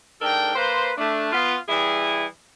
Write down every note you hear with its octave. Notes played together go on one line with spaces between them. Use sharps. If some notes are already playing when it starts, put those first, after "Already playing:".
G#2 D4 A4 A#4 G5
A#3 B4 C5
A3 D4
B3 F4
E3 G3 E4 G#4